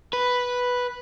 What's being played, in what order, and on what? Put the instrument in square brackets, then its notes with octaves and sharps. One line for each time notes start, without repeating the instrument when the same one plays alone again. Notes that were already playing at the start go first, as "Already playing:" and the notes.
[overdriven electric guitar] B4